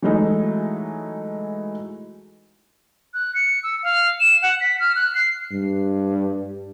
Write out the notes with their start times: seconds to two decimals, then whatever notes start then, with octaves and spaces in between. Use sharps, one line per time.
0.02 E3 F#3 G#3 A3 D#4
3.14 F#6
3.35 C#7
3.63 E6
3.83 F5
4.20 E7
4.42 F#5
4.61 B6
4.80 F6
4.96 F#6
5.15 C7
5.52 G2